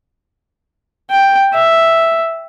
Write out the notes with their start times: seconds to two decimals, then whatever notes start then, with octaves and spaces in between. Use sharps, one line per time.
1.11 G5
1.54 E5